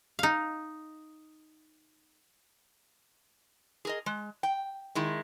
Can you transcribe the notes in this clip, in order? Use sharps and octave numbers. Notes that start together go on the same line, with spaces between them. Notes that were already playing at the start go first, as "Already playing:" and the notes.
D#4 F5
G#4 A#4 D#5
G#3
G5
D#3 G#3 E4